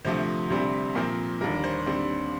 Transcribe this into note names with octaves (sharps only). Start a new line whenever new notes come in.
D2 C3 F3 A3 C5
D2 C3 G3 C4
A#2 F3 C4 A#4
D#2 D3 G3 A#3 A#4
C5
D#2 D3 G3 C4